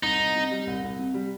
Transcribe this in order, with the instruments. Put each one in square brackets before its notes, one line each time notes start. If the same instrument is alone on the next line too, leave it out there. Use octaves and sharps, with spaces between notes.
[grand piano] C2 [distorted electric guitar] D#4
[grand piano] C2
C3
G3
C2
C2
C3
G3